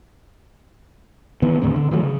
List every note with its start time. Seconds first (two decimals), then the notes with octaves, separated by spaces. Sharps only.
1.42 D#3 E3 B3
1.62 D#2 A2 D3 C4
1.76 D3
1.91 D#3 F3 F#3 A3
2.03 C#3